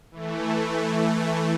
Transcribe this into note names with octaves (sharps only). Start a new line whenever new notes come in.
E3 A3